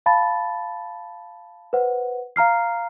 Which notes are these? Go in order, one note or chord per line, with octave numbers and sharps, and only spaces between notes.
F5 A5 B5 A6
B4 C5 F#5
F5 A#5 F6 C7